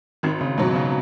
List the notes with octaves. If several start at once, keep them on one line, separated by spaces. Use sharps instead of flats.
G#1 D#3
C#3
G#2 B2 F#3
C#3